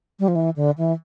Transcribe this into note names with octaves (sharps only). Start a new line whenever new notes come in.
G3
F3
E3
D3
E3